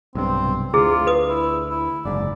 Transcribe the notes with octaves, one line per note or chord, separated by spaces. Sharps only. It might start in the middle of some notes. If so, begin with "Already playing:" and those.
B1 G2 C3 C4
D2 E4 F4 G#4
B4 D#6
E4
E4
F#1 G#2 D5